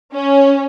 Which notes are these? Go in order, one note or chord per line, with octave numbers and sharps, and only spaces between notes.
C#4